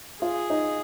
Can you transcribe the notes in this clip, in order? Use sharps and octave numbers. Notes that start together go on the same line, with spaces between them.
F4 G#4
D#4